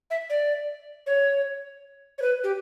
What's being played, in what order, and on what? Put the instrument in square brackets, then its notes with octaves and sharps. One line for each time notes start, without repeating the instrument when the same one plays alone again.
[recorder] E5
D5
C#5
C#5
B4
G4